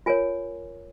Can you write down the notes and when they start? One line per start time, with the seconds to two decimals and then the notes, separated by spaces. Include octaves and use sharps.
0.06 F4 A#4 C#5 G#5